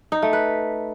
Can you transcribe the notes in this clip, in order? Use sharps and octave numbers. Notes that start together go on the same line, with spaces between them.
D#4
A3
B4